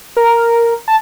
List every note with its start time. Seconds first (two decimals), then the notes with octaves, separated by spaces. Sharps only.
0.17 A#4
0.88 A5